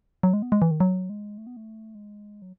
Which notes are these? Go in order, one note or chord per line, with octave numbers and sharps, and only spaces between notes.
F#3
G#3
B3
G#3
E3
D#3
F#3
G#3
A3
B3
A3
G#3
F#3